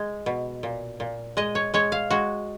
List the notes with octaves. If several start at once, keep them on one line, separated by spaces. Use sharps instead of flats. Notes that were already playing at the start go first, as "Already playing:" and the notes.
Already playing: G#3
B2
A#2
A#2
G#3 D#5
C#5
G#3 C#5
F5
G#3 F#4